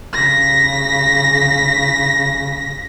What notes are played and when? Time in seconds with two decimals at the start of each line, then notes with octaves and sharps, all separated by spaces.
0.13 C#3 A#6 B6